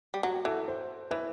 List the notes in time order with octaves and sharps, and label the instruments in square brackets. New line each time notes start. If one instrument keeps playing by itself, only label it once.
[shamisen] G3
[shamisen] F#3 [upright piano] F#4
[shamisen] E3 [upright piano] A4
[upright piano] C5
[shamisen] E3 [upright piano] B4